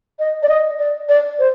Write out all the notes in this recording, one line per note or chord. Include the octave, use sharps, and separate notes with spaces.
D#5
D5
D#5
D5
D5
C5